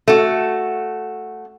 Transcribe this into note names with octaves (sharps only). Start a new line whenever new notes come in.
A3 F#4